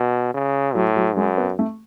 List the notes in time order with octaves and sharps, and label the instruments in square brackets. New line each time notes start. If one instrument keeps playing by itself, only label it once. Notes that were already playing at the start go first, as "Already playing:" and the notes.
Already playing: [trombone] B2
C#3
[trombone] A2 [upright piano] F#3
[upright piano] F#3
[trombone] F#2 [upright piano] G#3
[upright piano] B3
A3